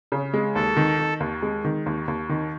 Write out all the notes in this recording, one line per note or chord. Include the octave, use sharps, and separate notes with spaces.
C#3
G#3
D#2 A4
D#3
D#3
D#2
G#3
D#3
D#2
D#2
D#3